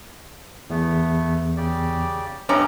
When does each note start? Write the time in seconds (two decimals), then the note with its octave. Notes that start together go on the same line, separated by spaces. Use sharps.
0.70 E2 A3 B3
1.57 C#3 G4 D5
2.49 D2 G2 A3 B3 C#4 D#5 A#5